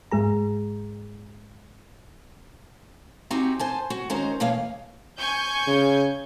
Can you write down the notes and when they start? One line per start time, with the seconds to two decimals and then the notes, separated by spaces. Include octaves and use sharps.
0.11 G#2 G#3 G#4 A#5
3.30 C4 D#4 F#4 G4 G#5
3.59 C5 G#5 A5
3.90 F#4
4.10 D#3 G#3 C#4 F#4 C5 A#5
4.40 B2 E3 A#3 C#5 F5
5.19 G#5 C#6 G6
5.68 C#3